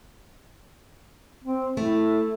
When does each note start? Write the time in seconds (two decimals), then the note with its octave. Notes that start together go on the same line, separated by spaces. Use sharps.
1.45 C4
1.77 A3 E4